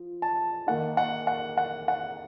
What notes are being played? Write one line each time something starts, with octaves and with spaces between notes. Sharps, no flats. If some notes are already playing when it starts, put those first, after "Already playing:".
Already playing: F3
A5
D#3 A#3 D#4 F#5
F#5
F#5
F#5
F#5